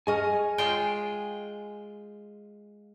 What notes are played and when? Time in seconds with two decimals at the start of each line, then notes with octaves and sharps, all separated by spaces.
0.07 G#4 D#5 G#5 C#6 F6
0.58 G#3 F4 G5